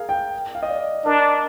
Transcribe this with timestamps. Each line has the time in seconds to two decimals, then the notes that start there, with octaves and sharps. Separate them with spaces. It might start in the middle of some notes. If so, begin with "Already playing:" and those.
Already playing: G#4 A#4 F5
0.09 G5
0.55 F5
0.63 D#5
0.70 D5
1.05 D4 A#4